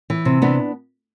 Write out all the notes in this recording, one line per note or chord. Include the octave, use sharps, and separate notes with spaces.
E3
C3
E3 B3 D4